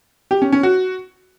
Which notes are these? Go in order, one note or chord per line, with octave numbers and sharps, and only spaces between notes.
G4
C#4
C#4
F#4